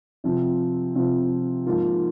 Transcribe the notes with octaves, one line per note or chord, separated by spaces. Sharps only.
C3 F3 C4 F4
C3 F3 C4 F4
G#2 F3 A#3 F4